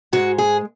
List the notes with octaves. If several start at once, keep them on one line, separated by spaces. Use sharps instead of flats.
G#2 G#3 F#4
G#4